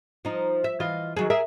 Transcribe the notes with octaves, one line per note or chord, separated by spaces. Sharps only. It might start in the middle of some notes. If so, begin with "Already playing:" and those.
F3 D#4
E5
E3 F4 D#5
D#3 F#3 G#4
G#4 A#4 E5